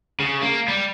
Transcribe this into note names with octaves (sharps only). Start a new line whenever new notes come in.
C#3
A#3
G3